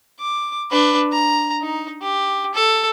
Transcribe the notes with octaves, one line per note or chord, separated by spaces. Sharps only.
D6
D4 B4
A#5
D#4
G4
A4